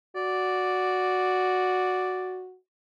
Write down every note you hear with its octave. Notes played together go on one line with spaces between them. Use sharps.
F#4 D5